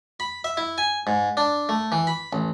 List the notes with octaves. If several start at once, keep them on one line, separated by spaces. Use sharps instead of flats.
B5
E5
E4
G#5
G#2
D4
A3
E3
B5
A1